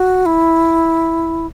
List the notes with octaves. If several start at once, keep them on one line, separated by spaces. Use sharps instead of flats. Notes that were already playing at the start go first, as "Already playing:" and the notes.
Already playing: F#4
E4